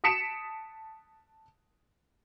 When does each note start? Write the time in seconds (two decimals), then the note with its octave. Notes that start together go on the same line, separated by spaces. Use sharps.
0.04 A5 D#6 B6 C#7 D7 E7